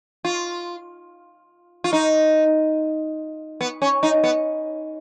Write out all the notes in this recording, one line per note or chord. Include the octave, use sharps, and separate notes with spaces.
F4
F4
D#4
B3
C#4
D#4
B3